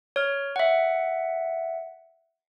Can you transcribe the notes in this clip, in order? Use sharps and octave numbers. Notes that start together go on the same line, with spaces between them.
C#5 F6
E5 F#5